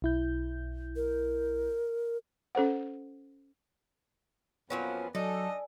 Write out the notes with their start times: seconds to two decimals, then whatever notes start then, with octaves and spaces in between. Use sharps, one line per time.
0.02 B1 E4 G6
0.96 A#4
2.55 C#4 A4 C5 F#5
4.70 F2 F3 F#3 A#3 B3 C#4
5.15 F#3 D4 D#4 A4 D5 D#5 G#5